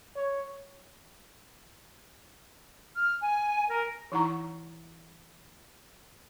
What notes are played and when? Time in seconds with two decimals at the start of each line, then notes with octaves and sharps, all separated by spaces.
0.16 C#5
2.95 F6
3.21 G#5
3.69 A#4
4.12 E3 D#4 E4 F#5 A#5 C#6